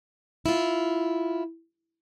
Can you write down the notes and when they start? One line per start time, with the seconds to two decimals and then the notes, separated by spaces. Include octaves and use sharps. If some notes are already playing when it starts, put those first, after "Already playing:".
0.46 E4 F4